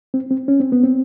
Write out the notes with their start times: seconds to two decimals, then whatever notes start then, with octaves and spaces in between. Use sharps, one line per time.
0.14 C4
0.31 C4
0.48 C#4
0.60 C4
0.72 B3
0.83 C4